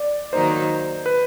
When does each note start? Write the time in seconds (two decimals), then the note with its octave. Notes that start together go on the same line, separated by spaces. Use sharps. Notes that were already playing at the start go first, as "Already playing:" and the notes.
Already playing: D5
0.32 D#3 F#3 A#3 D#4 C5
1.06 B4